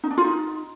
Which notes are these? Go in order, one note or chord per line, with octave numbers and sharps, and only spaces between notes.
D#4
D4
F4
D#4